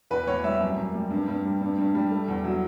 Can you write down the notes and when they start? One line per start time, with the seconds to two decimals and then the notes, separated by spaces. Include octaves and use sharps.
0.11 E2 B4
0.27 E2 C#5
0.44 G3 E5
0.61 F#2
0.77 F#2
0.94 G3
1.11 G2
1.28 G2
1.45 G3
1.61 G2
1.78 G2
1.95 G3
2.11 A3
2.28 E2
2.44 F#3